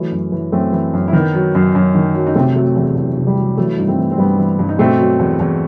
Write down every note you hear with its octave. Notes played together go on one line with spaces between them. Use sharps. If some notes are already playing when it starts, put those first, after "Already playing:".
Already playing: E3 F#3 A3
F#2
E3
F#2 A3 C4
E3
F#2
E4
D#3 B3 D#4
F#3
F#2
F#2
D#3
F#3
D#4
C3 A3 C4
F#3 A3
E2 F#3
E2 F#3
C3
G3
F#3
E3 F#3 A3
E4
G2 D#4
A3 C4
E3
C4
G2 G3 B3
E3
G2
D#4
B2 A3 C4
F#3
E2
E2